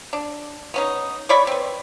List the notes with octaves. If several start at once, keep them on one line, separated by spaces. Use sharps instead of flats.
D4
B3 C#4 D#4
C#5 D5 B5 C#6
C4 B4